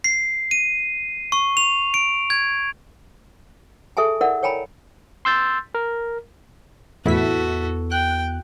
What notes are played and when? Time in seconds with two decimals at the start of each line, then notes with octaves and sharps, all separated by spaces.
0.04 C7
0.51 D#7
1.32 C#6
1.57 F7
1.94 D7
2.30 G#6
3.97 G#4 A4 E5 G#5 A5
4.21 E4 A#4 D5 E5 F#5
4.43 C#5 G5 G#5 A#5 B5
5.25 C6 E6 G6 A6
5.75 A#4
7.06 E2 A2 B3 E4 F#4 A4 B6
7.92 G5 F#6